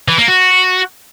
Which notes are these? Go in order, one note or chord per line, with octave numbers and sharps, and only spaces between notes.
E3
A#3
F#4